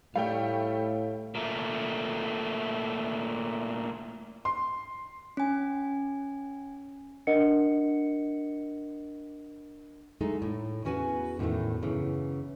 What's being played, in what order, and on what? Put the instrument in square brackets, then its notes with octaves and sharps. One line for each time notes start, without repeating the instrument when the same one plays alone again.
[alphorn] A2 [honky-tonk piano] G3 A3 G5 [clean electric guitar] F5
[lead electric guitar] A#2 A3
[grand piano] C6
[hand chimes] C#4 G#5
[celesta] D4 A#4 D#5 F#5 C#7
[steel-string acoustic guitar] F#3 G#3 A3 D#4 A4
A2
E2 C#4 F#4 B4 G#5
E2 A2 D#3 G#3 A3
F#2 C#3 E3